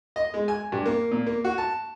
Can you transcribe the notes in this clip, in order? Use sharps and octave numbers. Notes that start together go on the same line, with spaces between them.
D#5
G#3
G#5
G2
A#3
A#2
A#3
F#4
A5